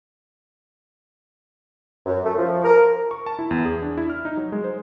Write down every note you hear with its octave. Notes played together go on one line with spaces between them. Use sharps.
F#2
A3
F3
A#4
C#6
A5
E4
E2
G#4
D4
E4
F6
D#4
F#3
G#3
C5